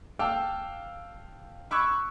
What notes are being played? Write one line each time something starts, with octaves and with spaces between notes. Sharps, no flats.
F5 G5 A5 D6 E6 F6
B5 C#6 D6 E6 F#6 G#6